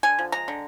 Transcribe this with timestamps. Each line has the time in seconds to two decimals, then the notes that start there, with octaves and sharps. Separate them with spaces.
0.03 D3 G#5
0.19 F3
0.32 G#3 A#5
0.48 D3